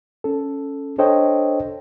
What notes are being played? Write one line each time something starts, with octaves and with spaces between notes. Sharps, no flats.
C#4 A4
D4 A4 C5 C#5 D#5 G5